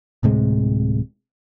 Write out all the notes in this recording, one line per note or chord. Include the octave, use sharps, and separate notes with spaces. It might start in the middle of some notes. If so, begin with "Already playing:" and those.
D1 A2 C3 G#3